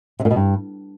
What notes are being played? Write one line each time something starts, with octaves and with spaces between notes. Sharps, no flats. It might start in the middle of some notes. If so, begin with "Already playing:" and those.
C3
A#2
B2
G2